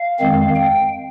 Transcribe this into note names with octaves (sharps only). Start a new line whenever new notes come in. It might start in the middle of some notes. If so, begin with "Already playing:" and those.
Already playing: F5
F2 D#3 G#3 C4
G5